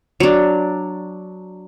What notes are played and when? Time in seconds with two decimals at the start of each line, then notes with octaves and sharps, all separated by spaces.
0.20 F#3 D4